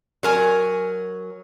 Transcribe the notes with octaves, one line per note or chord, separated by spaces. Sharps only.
F#3 A#4 G#5